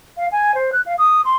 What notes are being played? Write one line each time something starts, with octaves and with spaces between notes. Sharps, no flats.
F5
G#5
C5
F#6
F5
D#6
C6